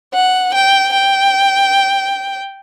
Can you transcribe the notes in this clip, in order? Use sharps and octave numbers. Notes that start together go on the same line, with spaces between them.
F#5
G5
G5